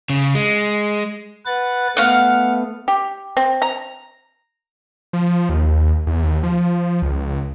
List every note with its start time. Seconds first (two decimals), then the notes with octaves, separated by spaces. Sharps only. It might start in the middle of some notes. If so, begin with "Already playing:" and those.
0.10 C#3
0.35 G#3
1.46 B4 F#5 A6
1.97 A3 B3 F5 F#5
2.88 G4
3.37 C4
3.62 A#5
5.13 F3
5.49 D#2
6.07 E2
6.22 D#2
6.43 F3
7.02 C#2